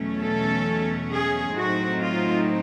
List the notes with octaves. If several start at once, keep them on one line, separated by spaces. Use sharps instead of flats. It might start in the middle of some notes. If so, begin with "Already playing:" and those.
Already playing: E2 B2 F#3 A3 C#4
A4
G#4
A2 F#3 A3 C4 D#4 F#4
F4